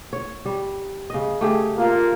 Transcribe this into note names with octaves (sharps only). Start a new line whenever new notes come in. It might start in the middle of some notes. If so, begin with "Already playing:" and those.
C#5
G3
C#3 D#5
A3 G4 G#4
A#3 F4